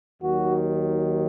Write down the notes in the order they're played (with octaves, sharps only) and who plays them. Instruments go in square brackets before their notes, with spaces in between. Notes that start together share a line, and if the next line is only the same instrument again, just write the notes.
[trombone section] D#2 D#3 F#3 F#4